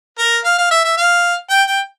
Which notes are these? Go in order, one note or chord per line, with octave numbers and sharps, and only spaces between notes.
A#4
F5
F5
E5
E5
F5
G5
G5